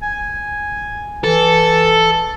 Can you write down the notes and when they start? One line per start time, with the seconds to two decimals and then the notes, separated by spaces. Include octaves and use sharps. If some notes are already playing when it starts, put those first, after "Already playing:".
0.02 G#5
1.24 E3 A4